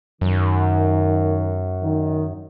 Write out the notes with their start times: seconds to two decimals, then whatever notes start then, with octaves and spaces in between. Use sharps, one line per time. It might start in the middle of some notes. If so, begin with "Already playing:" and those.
0.21 F#2 D#3
1.82 D#3